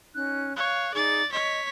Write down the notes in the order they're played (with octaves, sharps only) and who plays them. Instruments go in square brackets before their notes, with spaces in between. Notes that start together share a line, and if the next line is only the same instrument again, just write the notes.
[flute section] C#4 D#4 F#6
[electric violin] C#5 [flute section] F5 F#6
[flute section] D#4 G#4 [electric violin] D5 A6
[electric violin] C#5 B6 [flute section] D#5